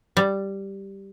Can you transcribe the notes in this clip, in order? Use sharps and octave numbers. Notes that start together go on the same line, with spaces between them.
G3